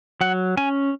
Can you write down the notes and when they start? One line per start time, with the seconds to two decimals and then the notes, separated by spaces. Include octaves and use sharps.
0.21 F#3 F#5
0.57 C#4 G#5